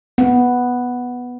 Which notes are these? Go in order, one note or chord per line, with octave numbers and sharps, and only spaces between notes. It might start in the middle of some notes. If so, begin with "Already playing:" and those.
B3